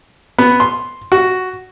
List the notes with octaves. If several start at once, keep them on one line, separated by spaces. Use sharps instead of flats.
B3
C6
F#4